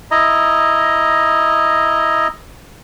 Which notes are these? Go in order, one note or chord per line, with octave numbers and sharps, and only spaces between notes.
E4 D#5 A#5